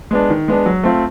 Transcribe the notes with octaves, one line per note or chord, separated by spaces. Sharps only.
G#3 B3 D4
D#3
G#3 B3 D4
F#3
A3 C4 F4